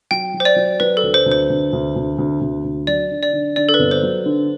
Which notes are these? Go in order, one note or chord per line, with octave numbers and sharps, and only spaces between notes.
F#3 G5
F#3
C5
D5
F#3
F#3 B4
A4
D2
C5
D2
C5
D2
D2
D2
D2
D2
D2
F#3 D5
D3
D5
D3
D3 D5
A4
B4
G1
C5
F#3
D3